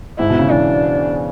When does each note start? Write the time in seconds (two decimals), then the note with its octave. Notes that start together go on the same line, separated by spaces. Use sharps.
0.19 G#2 E4
0.30 B2
0.39 C#3
0.50 E3 D4